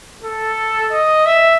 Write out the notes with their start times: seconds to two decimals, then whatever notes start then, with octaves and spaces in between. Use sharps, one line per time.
0.24 A4
0.92 D#5
1.26 E5